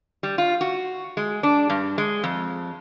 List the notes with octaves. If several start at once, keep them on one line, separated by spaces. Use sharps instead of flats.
G3
F4
F#4
G#3
D4
G2
G#3
F2